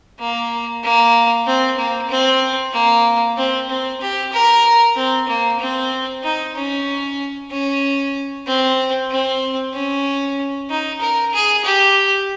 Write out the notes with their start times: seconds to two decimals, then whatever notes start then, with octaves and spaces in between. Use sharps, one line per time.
0.19 A#3
0.83 A#3
1.46 C4
1.78 A#3
2.10 C4
2.73 A#3
3.37 C4
3.69 C4
4.01 G4
4.32 A#4
4.96 C4
5.28 A#3
5.59 C4
6.24 D#4
6.56 C#4
7.51 C#4
8.47 C4
9.10 C4
9.74 C#4
10.70 D#4
11.01 A#4
11.33 G#4
11.64 G4